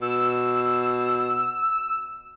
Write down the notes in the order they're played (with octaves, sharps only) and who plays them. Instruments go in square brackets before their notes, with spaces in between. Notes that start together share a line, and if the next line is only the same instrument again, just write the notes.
[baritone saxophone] B2 [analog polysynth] E6